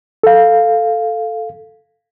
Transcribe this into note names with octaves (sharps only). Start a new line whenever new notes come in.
A4 F5